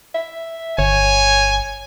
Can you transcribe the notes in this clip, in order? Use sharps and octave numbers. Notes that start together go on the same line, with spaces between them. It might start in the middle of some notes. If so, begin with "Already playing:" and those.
E5
G1 C#5 G#5